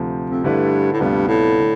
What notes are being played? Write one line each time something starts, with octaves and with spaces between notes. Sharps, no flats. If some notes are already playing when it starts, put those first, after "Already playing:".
Already playing: D2 C3 F3
F2
G2 D3 A3 E4 B4 D5
A2
D2 G2 C3 G3 B3 F4
A2
D3